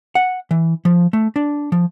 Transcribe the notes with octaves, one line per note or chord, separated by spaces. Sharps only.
F#5
E3
F3
A3
D4
F3